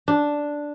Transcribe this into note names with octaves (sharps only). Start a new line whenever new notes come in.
D4